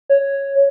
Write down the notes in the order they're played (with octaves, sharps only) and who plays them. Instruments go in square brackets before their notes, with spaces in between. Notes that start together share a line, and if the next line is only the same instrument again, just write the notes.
[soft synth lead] C#5